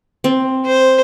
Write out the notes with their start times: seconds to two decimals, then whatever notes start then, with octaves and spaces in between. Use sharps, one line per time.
0.24 C4
0.66 C5